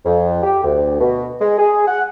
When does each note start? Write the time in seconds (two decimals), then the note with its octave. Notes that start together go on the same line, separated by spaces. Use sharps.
0.05 F2
0.43 G4
0.64 D2
1.00 B2
1.41 G#3
1.58 G#4
1.88 F#5